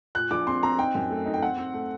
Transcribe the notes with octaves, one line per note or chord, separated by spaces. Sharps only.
A#2 F#6
A#1 D6
C4 C6
C4 A#5
D#4 G5
F#2
A3
D#4
G5
C4 F#5
C4
A3